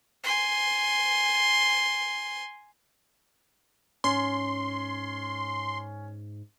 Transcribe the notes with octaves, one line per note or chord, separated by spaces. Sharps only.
G#5 C6
G#2 C#4 C6